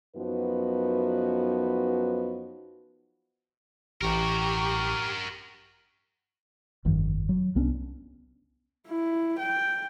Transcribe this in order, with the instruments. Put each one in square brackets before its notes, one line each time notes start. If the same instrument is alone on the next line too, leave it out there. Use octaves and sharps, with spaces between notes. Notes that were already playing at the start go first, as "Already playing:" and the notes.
[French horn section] F#2 F3 B3 D#4 F#4 B4
[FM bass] A1 [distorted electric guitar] F#4 A#4 [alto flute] G4 [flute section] A#5 C#6
[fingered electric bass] G1 F2 D#3 F3
F#3
C2 B3 C#4 D4
[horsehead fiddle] E4
G5